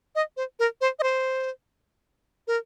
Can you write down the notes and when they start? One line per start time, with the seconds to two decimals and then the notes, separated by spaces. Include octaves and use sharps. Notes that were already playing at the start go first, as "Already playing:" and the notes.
0.15 D#5
0.37 C5
0.59 A#4
0.81 C5
0.99 D#5
1.03 C5
2.48 A#4